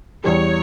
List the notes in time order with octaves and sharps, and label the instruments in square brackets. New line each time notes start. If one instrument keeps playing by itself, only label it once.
[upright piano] E2 E3 G3 [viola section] C#5